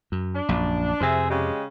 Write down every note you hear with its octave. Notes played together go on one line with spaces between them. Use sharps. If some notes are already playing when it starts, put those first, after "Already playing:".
F#2
D4
A#1 F#2
F2 C3 G#4 C5 E5
C#3 G#3 G4